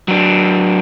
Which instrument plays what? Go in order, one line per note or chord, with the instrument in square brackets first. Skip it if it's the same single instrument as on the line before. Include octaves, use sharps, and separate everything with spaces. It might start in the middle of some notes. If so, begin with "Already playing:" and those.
[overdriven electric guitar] F#3 D4